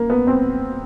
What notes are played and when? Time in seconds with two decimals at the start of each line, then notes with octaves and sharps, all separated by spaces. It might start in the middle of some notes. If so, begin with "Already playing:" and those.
Already playing: A#3
0.10 B3
0.27 C4